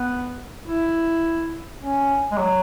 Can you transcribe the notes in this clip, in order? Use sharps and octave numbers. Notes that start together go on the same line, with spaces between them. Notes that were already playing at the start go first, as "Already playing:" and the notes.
Already playing: B3
E4
C#4
G#3
F#3